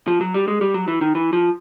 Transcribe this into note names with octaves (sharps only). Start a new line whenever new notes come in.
F3
F#3
G3
G#3
G3
F#3
E3
D#3
E3
F3